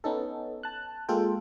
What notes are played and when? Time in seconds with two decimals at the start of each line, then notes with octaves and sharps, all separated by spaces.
0.04 B3 C#4 D#4 A4
0.63 A5 F#6
1.08 G#3 A#3 F4 A4 G5